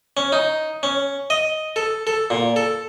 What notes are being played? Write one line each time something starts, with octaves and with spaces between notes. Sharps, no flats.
C#4
D#4
C#4
D#5
A4
A4
A#2
A4